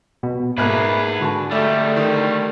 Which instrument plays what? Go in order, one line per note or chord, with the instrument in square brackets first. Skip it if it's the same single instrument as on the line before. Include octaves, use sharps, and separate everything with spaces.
[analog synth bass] B2
[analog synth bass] G#2 [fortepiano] A3 A#3 F#6 [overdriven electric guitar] G#4 B4
[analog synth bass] D3 [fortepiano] F#4 A5
[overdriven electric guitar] G3 A3 [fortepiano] D5 E5
[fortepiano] D#3